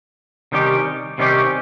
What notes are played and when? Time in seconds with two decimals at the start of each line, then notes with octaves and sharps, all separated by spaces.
0.52 C3 D#3 G3 C#4 G4
1.18 C3 D#3 G3 C#4 G4